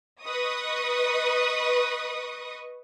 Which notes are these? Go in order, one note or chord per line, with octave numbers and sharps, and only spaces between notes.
B4 D#5 C#6 D#6